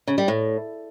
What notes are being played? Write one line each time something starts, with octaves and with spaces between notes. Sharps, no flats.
C#3
G3
A2